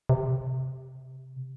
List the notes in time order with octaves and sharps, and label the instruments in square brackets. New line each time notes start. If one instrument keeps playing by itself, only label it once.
[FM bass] C3